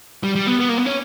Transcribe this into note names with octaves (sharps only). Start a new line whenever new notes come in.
G3
G3
B3
B3
A#3
B3
C#4